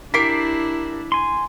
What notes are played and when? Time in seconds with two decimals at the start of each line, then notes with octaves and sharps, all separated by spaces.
0.14 D4 E4 G4 A#4 D6 B6 C7
1.12 G#5 C6